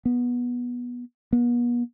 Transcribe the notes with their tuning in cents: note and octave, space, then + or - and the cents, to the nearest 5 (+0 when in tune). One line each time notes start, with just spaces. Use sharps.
B3 -15
B3 -40